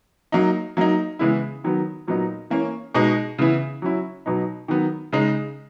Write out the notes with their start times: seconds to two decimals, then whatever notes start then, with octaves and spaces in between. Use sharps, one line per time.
0.32 F#3 A#3 D#4
0.77 F#3 A#3 D#4
1.19 C#3 E3 G#3 B3 E4
1.64 D#3 F#3 B3
2.07 A#2 F#3 B3 D#4
2.50 E3 A#3 C#4
2.94 B2 G#3 D#4
3.39 C#3 E3 B3 E4
3.82 F#3 C#4 E4
4.26 B2 F#3 B3 D#4
4.68 D#3 F#3 B3
5.13 C#3 G#3 D#4